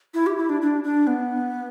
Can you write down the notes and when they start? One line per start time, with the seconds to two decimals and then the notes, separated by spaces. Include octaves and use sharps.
0.14 E4
0.26 G4
0.38 E4
0.49 D4
0.62 D4
0.84 D4
1.07 B3